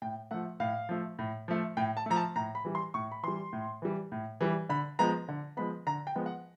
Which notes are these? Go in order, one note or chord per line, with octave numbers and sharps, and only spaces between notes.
A2 G5
F3 A3 F#5
A2 F5
F3 A3
A2
F3 A3
A2 G5
A5
F3 A3 A#5
A5
A2 A#5
B5
E3 G3
C6
A2 C#6
B5
E3 G3 C6
A2
E3 G3
A2
E3 G3
D3 B5
F3 G#3 B3 A#5
D3
F3 G#3 B3 B5
D3 A#5
G5
F3 G#3 B3
F#5